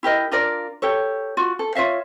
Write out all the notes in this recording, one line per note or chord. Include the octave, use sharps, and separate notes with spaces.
E4 G4 A#4 D#5
D4 F4 A#4 D5
G4 A4 C#5
F4 F#4
A4
F4 C#5 E5 F5